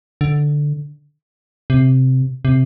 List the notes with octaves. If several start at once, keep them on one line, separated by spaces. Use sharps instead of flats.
D3
C3
C3